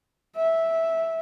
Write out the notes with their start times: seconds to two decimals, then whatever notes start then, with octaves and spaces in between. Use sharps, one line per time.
0.36 E5